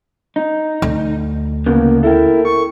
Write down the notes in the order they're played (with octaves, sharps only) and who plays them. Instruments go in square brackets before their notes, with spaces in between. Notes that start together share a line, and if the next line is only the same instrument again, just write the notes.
[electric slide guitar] D#4
[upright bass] D2
[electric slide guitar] A2 C#3 B3 [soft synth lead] A#3
[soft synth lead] E4 [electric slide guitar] A4 A#4 G5
[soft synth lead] C#6